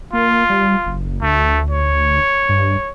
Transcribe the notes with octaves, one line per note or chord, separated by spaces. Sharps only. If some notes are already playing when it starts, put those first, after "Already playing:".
A#3 F4
G3
F#1
D2 A3
C#5
G2